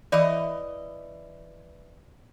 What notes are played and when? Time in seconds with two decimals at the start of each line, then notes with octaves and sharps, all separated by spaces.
0.12 E3 D5 D#5